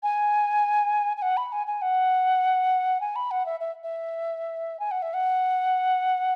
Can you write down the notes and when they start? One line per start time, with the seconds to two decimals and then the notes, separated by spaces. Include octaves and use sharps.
0.03 G#5
1.17 G#5
1.22 F#5
1.37 B5
1.52 G#5
1.67 G#5
1.82 F#5
3.01 G#5
3.16 B5
3.31 F#5
3.46 E5
3.60 E5
3.83 E5
4.80 G#5
4.91 F#5
5.02 E5
5.14 F#5